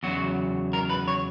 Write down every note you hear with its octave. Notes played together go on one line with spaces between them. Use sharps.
E2 C#3 F#3 F#4
A#4
B4
C#5